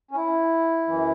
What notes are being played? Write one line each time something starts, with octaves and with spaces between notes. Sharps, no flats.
C#4
E4
F#2 E3